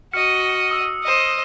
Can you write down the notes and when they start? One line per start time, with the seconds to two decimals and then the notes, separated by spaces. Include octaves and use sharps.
0.13 F#4 D#5 F6 C#7
0.71 D#6 E6
1.03 C5 D#5